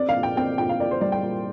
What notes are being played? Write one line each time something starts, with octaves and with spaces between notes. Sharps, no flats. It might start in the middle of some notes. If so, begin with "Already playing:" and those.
Already playing: C4 D5
F5
A#2
G5
C4 G5
A#2 G5
F5
A#2 D5
C5
G3 D5
G5
A#2